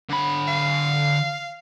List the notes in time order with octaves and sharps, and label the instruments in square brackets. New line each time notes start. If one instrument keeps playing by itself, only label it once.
[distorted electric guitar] D3 B5
[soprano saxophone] F5